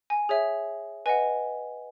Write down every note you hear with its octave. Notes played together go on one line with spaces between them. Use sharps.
G#5
G#4 C#5 E5
B4 D#5 F#5 G#5